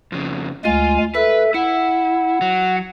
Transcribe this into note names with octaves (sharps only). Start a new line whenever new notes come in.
F2 C#3
D2 G#3 F4 G#5
A4 B4 E5
E4 F#5
F#3